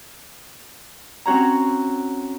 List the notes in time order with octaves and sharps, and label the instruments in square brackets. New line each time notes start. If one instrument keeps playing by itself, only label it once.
[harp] C4 C#4 F#4 C#5 A#5